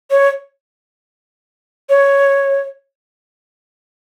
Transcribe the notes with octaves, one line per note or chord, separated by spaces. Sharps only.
C#5
C#5